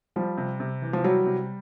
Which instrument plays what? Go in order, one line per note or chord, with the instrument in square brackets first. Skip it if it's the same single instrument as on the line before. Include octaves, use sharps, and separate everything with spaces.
[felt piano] F3 [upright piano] G3
[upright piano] C3
C3
E3
[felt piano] F3
[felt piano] F#3 [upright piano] G3
[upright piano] C3